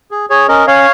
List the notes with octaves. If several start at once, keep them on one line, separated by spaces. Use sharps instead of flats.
G#4
G#4 C#5
C#4 A#4 D#5
C#4 C#5 F5